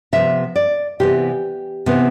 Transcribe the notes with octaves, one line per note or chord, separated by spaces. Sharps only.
C3 F3 B3 E5
D5
C3 E3 B3 G4
C3 E3 B3